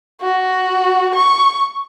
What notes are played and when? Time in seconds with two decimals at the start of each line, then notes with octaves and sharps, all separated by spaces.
0.21 F#4
1.15 C#6